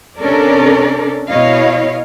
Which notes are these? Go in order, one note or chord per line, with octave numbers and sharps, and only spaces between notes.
C3 C#4 D4 A4 A#4 D5
B2 E4 C#5 D#5 F5